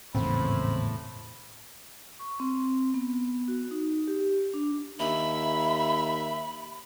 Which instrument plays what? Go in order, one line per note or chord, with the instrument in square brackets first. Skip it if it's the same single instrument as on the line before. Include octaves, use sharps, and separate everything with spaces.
[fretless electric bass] G#1 E2 [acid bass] A2 [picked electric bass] C#3 B3 C4 [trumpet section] C5 B5
[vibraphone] C#6
C4
B3
F#4
D#4
G4
D4
[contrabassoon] D#2 [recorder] E5 [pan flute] B5